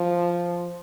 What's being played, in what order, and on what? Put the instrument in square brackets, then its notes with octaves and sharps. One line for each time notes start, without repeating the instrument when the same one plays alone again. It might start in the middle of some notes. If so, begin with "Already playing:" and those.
Already playing: [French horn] F3